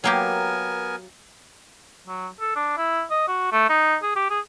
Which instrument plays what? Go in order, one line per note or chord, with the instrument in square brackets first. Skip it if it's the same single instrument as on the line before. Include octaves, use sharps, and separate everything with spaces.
[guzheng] F#3 A#3 G4 [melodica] B3 A#4 G#5
[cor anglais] F#3
A4
D4
E4
D#5
F#4
A3
D#4
G#4
G4
G#4